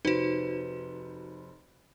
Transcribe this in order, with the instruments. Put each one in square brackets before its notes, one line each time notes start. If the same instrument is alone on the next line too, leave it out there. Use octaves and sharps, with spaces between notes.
[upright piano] F1 B4 C5 [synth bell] D#4 F#4